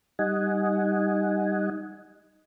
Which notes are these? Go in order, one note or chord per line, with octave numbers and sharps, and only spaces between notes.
G3 D#4 D#5 F#5 G#5